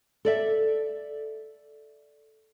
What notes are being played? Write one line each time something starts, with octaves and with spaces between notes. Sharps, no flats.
A4 D5 E5